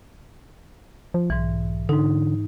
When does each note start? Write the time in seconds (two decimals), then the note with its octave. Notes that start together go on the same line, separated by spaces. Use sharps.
1.14 F3
1.30 B1 G#2 E3
1.89 G#2 D3 D#4